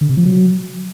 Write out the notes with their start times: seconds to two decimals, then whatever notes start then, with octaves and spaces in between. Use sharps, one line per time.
0.01 D3
0.09 C3
0.17 F3
0.25 F#3